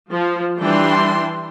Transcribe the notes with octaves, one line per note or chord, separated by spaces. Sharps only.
F3
E3 G3 D4 G5 C6